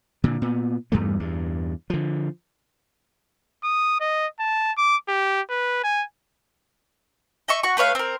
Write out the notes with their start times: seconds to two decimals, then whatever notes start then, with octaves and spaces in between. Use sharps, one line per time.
0.24 A#2 D3
0.42 A#2 B3
0.92 E2 G2 G3 A3
1.20 E2 G2
1.90 D3 F3
3.64 D#6
4.01 D#5
4.39 A5
4.77 D6
5.08 G4
5.49 B4
5.83 G#5
7.48 D#5 E5 C#6
7.63 F#4 C#6
7.77 A3 B4 C#5 F5
7.95 C4 A#4